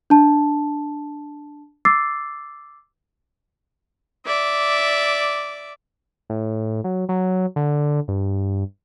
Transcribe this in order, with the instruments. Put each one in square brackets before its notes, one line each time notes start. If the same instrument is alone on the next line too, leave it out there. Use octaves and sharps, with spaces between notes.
[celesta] D4 A5
D6 E6 A6 C7
[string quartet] D5 E5 D6
[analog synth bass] A2
F#3
F#3
D3
G2